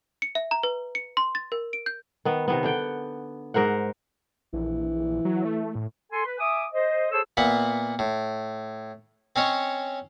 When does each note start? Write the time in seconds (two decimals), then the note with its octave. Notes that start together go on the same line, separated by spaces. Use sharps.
0.22 C#7
0.35 E5
0.51 A#5
0.63 B4
0.95 C#7
1.17 C6
1.35 A6
1.52 A#4
1.73 D7
1.86 G6
2.25 D#3 B3
2.48 C3 D#3 B3
2.63 D3 F#5 G5
3.54 G#2 A#4 C5 F#5
4.53 A#1 E3
5.25 F#3
5.45 A3
5.75 A2
6.12 A4 G#5 C6
6.25 B4
6.39 E5 G#5 D6 D#6
6.73 C5 D#5
7.11 G#4 A4 C5 C#5 A5 E6
7.37 A#2 B3 E5 F#5
7.99 A2
9.36 C4 C#4 C#5 D#5